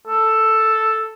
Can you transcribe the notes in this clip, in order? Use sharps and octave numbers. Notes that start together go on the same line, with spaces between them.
A4